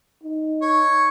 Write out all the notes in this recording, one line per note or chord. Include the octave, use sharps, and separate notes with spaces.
D#4
C#5